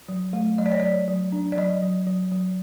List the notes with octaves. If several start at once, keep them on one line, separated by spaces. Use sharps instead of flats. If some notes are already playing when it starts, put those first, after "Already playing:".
F#3
A3
F#3 D#5
D5
C#5
F#3 D5
F#3
D4
D5
F#3 D#5
F#3
F#3
F#3